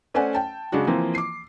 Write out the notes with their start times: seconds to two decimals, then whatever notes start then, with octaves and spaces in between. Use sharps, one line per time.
0.14 A3 C#4 C5 D5 F#5 G#5
0.35 G5 A5
0.72 C#3 G#3 D4 F#4
0.87 E3 F3 A#3 C4
1.15 D6 C7